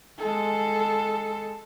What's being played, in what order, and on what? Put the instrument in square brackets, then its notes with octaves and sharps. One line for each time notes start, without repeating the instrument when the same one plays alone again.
[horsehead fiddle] G#3 A4